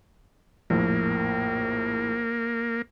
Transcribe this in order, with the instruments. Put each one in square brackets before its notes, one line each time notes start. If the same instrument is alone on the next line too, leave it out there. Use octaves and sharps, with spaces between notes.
[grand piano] A#1 F2 A2 [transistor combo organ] A#3